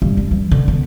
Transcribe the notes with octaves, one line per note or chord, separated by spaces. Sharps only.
G2
G3
E3
D3
B3